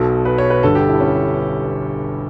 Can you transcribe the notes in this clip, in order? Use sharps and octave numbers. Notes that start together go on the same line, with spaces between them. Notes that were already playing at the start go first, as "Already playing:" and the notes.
Already playing: B1 B2 A4
B4
C#5
B4
G1 G2 D3 A4
G4
E4
C#4